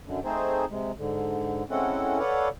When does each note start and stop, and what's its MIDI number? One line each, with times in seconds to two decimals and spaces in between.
0.06 0.20 42
0.06 0.20 50
0.25 0.65 57
0.25 0.65 60
0.25 0.65 63
0.25 0.65 68
0.25 0.65 72
0.70 0.92 48
0.70 0.92 56
0.98 1.63 44
0.98 1.63 50
1.70 2.19 56
1.70 2.19 60
1.70 2.19 61
1.70 2.19 64
1.70 2.19 69
1.70 2.19 78
2.19 2.49 69
2.19 2.49 71
2.19 2.49 73
2.19 2.49 74
2.19 2.49 77
2.19 2.49 78